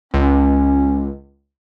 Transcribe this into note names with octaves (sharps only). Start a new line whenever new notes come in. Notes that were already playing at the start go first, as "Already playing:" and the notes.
C#2 C#4